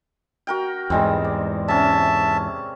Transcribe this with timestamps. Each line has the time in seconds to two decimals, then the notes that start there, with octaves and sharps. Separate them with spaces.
0.47 F#4 A#4 G5
0.90 E2 G#2 G3 G#3 C4
1.24 D5
1.68 C3 C#4 E5 A5